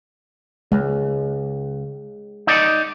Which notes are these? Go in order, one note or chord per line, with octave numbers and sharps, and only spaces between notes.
C#2 G#3
D#4 D5